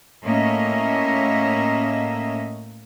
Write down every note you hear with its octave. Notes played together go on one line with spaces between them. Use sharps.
A2 A#3 C#4 D#5 E5